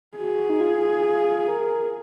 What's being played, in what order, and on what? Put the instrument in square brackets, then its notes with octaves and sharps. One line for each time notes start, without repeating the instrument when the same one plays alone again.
[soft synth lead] F#4 [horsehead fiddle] G#4
[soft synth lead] D#4
F4
F4
A#4